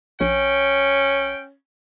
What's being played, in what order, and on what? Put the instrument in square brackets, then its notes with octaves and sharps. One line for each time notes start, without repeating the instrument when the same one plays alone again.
[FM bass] A#1 [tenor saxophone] C#4 [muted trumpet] G5